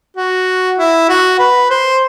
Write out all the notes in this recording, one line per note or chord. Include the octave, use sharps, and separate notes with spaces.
F#4
E4
F#4
B4
C5